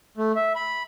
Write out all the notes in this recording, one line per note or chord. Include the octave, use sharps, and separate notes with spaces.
A3
E5
B5